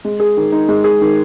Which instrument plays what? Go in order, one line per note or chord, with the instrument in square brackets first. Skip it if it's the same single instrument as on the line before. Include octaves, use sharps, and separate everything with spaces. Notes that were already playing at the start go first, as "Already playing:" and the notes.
[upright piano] G#3
G#4
D#3
D#4
G#3
G#4
D#3